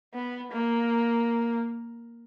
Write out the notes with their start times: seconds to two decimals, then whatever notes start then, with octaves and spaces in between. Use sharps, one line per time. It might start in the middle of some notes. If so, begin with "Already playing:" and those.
0.14 B3
0.51 A#3